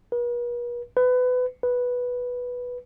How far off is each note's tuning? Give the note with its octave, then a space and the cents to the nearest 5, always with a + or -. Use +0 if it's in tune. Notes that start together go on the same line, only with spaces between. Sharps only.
B4 -45
B4 +25
B4 -5